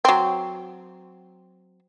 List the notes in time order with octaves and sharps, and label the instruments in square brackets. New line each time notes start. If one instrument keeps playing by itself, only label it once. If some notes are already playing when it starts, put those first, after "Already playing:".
[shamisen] F#3 C4